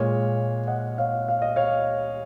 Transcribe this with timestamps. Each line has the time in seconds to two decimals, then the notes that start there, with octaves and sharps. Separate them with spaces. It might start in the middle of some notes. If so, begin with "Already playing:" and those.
Already playing: A#2 G#3 C#5 F5
0.67 D#5 F#5
0.98 C#5 F5
1.28 F5
1.42 D#5
1.56 C#5 F5